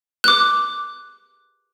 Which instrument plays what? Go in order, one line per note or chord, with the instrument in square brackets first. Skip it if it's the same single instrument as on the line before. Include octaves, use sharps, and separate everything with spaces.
[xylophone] D6 F#6